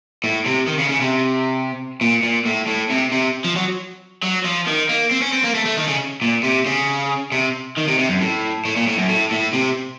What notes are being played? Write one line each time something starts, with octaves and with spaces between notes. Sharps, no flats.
A2
C3
D#3
C#3
C#3
C3
A#2
A#2
A2
A2
C3
C3
F3
F#3
F#3
F3
D#3
A#3
C4
C#4
C4
A#3
A3
A3
D#3
C#3
A#2
C3
C#3
C3
D#3
C3
C3
F#2
A2
A2
A#2
A2
F#2
A2
A2
C3